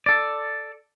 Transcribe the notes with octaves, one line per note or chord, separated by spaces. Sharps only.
A4 D5